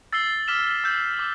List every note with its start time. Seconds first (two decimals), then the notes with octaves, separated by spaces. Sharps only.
0.13 E6 A6 C7 G7
0.48 D6 F6 B6 E7 G7
0.84 E6 G6 C7
1.19 D6